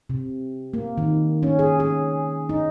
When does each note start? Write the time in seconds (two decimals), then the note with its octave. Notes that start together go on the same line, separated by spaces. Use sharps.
0.10 C3
0.74 A#3
0.98 D#3
1.43 C#4
1.59 G#4
1.80 G#4
2.49 D#4